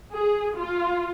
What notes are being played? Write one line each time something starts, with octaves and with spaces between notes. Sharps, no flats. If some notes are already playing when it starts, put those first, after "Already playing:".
G#4
F4